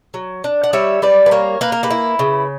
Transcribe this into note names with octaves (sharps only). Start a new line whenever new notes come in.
F#3
D4
F#5
G3 C#5 E5
G3 B4 D5
B4
A#3 A#4 C#5
A#3 B4
A#4
G4 B4
E4
C#3